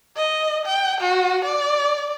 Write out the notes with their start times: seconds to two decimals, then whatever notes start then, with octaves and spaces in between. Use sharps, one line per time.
0.17 D#5
0.66 G5
1.01 F#4
1.45 D5